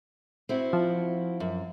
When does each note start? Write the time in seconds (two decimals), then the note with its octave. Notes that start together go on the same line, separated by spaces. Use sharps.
0.49 C4 E4 F#4
0.73 F3
1.40 F#2